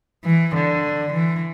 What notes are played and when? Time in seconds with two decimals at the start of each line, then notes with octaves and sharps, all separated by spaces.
0.25 E3
0.55 D3
1.13 E3